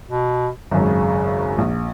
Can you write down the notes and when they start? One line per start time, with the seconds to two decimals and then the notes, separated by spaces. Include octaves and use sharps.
0.08 B2
0.71 G#1 F#2 C#3
1.58 A#1